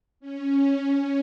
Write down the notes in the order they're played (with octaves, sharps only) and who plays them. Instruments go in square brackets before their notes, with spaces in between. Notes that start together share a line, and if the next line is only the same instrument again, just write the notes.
[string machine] C#4
C#4